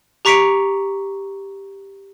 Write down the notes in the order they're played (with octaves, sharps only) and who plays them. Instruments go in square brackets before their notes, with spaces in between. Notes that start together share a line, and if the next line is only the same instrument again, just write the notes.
[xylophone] G4 A#5 C#6 B6 C#7 D7